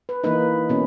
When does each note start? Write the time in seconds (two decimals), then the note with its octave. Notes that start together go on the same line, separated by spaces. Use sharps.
0.09 B4
0.24 E3 A#3 D#4 B4
0.69 B2 A#3 C#4